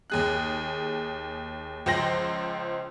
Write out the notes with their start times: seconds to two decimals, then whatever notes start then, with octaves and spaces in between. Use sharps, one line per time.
0.10 D#2 G#4 F#6
1.86 C#2 F3 C5 G5 A#6 F#7